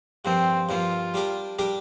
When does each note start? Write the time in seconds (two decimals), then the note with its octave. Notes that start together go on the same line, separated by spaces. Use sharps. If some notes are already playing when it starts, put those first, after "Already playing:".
0.25 G2 F3 A#3 C4
0.69 G2 F3 A#3 F4
1.14 G3 D4 G4 A#4
1.59 G3 D4 G4 A#4